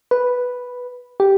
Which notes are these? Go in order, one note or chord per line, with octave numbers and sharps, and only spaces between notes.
B4
G4